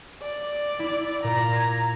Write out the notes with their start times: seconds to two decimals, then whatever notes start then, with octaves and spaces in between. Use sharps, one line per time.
0.22 D5
0.79 E4
1.24 A#2 A#5
1.56 G#6